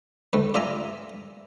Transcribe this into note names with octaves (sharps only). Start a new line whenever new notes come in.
D2 A3 B4
F4 D5 E5 G#5 A#5